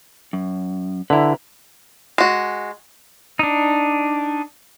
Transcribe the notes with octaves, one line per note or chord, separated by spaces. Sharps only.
F#2
D3 E4 B4 A#5
G#3 F#4
D4 D#4